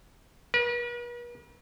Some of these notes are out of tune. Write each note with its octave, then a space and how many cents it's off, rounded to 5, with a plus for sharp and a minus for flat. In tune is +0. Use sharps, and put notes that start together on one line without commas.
B4 -45